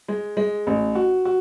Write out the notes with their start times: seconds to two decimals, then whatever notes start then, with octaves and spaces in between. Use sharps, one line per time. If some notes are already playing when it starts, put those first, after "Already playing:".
0.08 G#3
0.37 G#3
0.67 A1
0.95 F#4
1.25 F#4